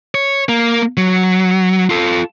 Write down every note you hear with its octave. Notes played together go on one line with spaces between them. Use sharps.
C#5
A#3
F#3
F4 A4